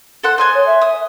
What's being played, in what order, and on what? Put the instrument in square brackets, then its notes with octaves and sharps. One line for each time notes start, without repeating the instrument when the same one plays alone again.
[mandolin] A4 C5 F#5
C5 D#5 G#5
[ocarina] C#5
E5
[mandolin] D#6